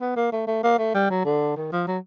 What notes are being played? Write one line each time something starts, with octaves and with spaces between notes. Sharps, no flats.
B3
A#3
A3
A3
A#3
A3
G3
F#3
D3
D#3
F3
F#3